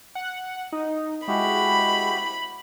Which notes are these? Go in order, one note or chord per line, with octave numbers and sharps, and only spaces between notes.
F#5
D#4
G#3 E4 F#4 G4 B5